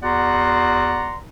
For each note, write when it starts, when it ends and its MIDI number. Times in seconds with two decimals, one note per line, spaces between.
0.03 1.17 40
0.03 1.17 66
0.03 1.17 74
0.03 1.17 78
0.03 1.17 82
0.03 1.17 84